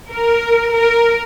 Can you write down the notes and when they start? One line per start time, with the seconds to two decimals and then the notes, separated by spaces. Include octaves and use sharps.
0.11 A#4
0.75 A#4